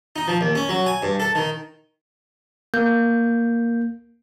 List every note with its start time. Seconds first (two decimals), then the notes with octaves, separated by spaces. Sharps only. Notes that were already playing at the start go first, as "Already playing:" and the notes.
0.16 D#4
0.28 F3
0.41 D#2
0.55 C#4
0.69 F#3
0.86 G#5
1.02 G2
1.20 A4
1.35 D#3
2.74 A#3 G6